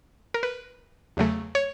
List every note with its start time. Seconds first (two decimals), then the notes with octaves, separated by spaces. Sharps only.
0.34 A#4
0.43 B4
1.17 E2 C#3 F#3 A3
1.55 C#5